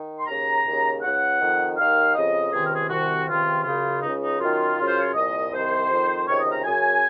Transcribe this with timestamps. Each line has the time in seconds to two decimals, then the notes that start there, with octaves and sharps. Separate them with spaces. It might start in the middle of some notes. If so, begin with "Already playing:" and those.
Already playing: D#3
0.20 C6
0.26 D#2 C#3 A#5
0.64 D#2 C#3
1.02 C#2 C#3 F#5
1.39 F2 D#3
1.77 D#2 D#3 F5
2.15 F2 C#3 D#5
2.52 C#2 C3 D#3 G#4
2.64 A#4
2.75 G#4
2.88 C2 C3 D#3 F#4
3.27 C#2 C3 D#3 F4
3.64 F#2 C#3 F4
4.02 C#2 C#3 D#4
4.22 D#4
4.39 F#2 D#3 F4
4.76 F#2 C#3
4.86 C5
5.00 C#5
5.14 C2 A#2 D#5
5.51 C2 C3 D#3 C5
5.90 F2 D#3
6.26 C#2 C3 D#3 C#5
6.39 D#5
6.51 A#5
6.64 F#2 C#3 G#5